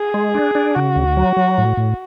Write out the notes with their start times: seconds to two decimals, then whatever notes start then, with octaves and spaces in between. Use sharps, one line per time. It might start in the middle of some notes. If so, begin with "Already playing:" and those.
Already playing: G#4
0.14 G#3
0.35 D4
0.55 D4
0.75 C#3 F#4
0.96 D2
1.17 F#3
1.37 F#3
1.58 A2
1.77 A2